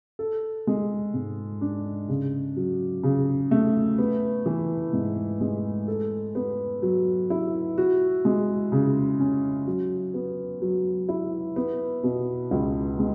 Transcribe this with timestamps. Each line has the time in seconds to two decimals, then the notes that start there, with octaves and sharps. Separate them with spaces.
0.19 A4
0.67 G#3
1.14 G#2
1.61 D4
2.09 C#3
2.56 F#3
3.03 C#3
3.51 A3
3.98 B3
4.46 E3
4.93 G#2
5.41 G#3
5.88 A4
6.35 B3
6.82 F#3
7.30 E4
7.78 F#4
8.25 G#3
8.72 C#3
9.19 C#4
9.67 F#3
10.14 B3
10.62 F#3
11.09 E4
11.56 B3
12.03 B2
12.51 C#2
12.99 G#3